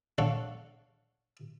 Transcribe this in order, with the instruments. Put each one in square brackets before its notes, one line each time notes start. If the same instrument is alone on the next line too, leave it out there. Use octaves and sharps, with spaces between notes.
[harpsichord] D4 A4 C#5 F5 F#5